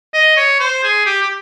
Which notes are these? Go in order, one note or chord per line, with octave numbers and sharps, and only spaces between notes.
D#5
C#5
C5
G#4
G4
G4